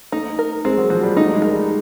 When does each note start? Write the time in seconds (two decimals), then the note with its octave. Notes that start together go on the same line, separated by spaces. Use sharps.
0.12 A3 D#4
0.39 A#4
0.65 G#3 C4
0.77 F#3
0.90 F3 F#4
1.03 G3
1.16 A3 D#4
1.34 G#3
1.42 A#4
1.51 G3